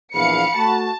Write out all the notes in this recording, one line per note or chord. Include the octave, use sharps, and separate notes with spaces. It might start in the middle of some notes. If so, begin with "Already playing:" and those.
A#1 E2 F5 B5 C#7
A3 F#4 A5